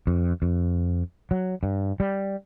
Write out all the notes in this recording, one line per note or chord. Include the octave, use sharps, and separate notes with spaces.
F2
F2
F#3
G2
G3